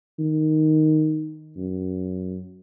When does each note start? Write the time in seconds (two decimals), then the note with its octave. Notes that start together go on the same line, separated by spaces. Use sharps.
0.19 D#3
1.57 F#2